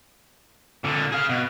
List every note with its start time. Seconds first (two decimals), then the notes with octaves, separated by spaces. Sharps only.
0.84 A#2 D3
1.12 G#4 F5
1.29 B2